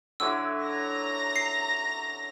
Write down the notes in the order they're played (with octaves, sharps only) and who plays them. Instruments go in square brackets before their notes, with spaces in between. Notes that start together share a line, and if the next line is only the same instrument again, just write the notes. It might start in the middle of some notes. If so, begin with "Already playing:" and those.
[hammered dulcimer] D3 F#3 E4 [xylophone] E6
[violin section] A#5 A#6
[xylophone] C7